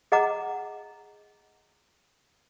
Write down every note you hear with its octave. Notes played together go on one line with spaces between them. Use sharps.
G#4 D#5 F#5 A#5 D6